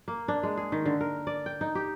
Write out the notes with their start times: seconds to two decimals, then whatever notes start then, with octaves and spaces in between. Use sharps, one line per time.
0.08 A#3
0.28 D4
0.43 G#3
0.57 G#4
0.72 D#3
0.86 D3
1.01 A#4
1.27 D5
1.46 G5
1.61 D#4
1.75 G4